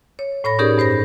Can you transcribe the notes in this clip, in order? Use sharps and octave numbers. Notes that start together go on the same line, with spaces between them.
C#5
A2 C#5 B5 A#6
C#4 D#4 G4 G#4 A#4 D5
G2 C5 B5 A#6